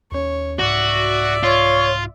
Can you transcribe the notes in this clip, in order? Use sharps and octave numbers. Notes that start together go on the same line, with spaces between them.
D#2 C#4 C#5
C2 G#2 F#4 D5 E5
F4 C#5